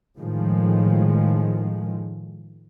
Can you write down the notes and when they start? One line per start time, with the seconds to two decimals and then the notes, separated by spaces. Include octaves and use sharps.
0.17 A2 D#3 F3 G#3